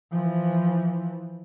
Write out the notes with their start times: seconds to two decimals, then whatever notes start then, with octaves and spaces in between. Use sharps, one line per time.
0.12 E3 F3